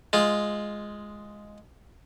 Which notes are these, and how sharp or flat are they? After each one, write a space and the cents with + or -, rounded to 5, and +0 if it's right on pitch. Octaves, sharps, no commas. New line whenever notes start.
G#3 +0 F4 +0